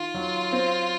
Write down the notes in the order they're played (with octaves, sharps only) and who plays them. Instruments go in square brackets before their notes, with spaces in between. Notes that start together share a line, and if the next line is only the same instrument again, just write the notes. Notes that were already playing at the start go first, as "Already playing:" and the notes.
Already playing: [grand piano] D#3 [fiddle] F4
[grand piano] F#3
C4